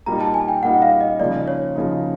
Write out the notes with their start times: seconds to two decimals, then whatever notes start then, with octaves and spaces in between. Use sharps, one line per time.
0.06 A#2 G3 A#3 D#4 A#5
0.21 A5
0.34 G#5
0.48 G5
0.63 A#2 G3 A#3 D#4 F#5
0.82 F5
1.01 D#5
1.20 C#3 F3 A#3 D#4 D5
1.48 C#5
1.76 C#3 F3 A#3 D#4